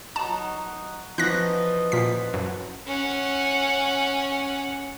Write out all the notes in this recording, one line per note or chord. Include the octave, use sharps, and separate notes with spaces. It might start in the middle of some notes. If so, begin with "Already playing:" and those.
F#3 D#4 F#4 A5
E3 F3 C#4 F#4 D#5 F#6 A#6
A#2 F#5 B6
F#2
C#4 F#5